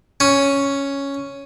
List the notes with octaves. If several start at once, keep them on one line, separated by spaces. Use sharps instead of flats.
C#4